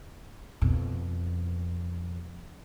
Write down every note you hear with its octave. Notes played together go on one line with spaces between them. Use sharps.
F2 B2